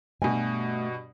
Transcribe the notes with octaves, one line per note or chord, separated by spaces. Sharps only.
G2 B2 A3 G#5